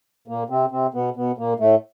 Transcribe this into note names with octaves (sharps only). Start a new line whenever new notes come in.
A#2 A#3
C3 C4
C3 C4
B2 B3
B2 B3
A#2 A#3
A2 A3